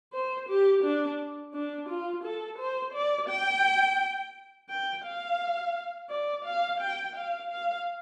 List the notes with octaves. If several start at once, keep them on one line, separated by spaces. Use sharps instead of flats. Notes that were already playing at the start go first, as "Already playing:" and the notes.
C5
G4
D4
D4
F4
A4
C5
D5
G5
G5
F5
D5
F5
G5
F5
F5